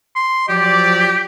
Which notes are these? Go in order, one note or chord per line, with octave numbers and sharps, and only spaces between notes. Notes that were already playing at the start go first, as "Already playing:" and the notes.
C6
F3 F#3 G4 D5